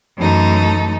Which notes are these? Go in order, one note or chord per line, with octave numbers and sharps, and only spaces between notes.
F#2 E3 A3 D#4 A4